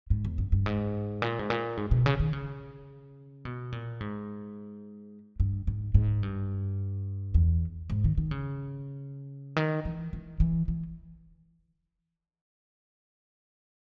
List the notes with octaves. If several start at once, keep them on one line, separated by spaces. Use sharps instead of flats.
G#2
E2
G2
G2
G#2
A#2
G#2
A#2
G#2
B2
C#3
D#3
C#3
B2
A#2
G#2
G2
G#2
G#2
G2
E2
G#2
D#3
D#3
C#3
D#3
E3
E3
E3
E3